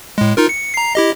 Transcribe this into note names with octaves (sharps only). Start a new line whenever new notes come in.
A2 G#3
D#4 F4 A#4
C#7
A#5 C7
E4 G4 D#5